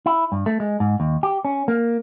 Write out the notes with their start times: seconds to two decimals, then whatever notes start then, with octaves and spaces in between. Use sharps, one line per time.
0.06 E4
0.32 G2
0.46 A3
0.60 G#3
0.80 G#2
1.00 D#2
1.23 G4
1.45 C#4
1.68 A#3